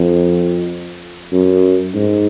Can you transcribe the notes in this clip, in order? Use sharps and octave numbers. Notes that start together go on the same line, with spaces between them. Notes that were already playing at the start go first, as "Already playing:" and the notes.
Already playing: F2
F#2
G#2